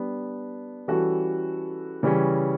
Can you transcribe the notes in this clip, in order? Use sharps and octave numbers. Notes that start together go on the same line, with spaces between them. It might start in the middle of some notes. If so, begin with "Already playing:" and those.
Already playing: G3 B3 D4
E3 G3 C#4 F#4 A4
C#3 E3 G3 C#4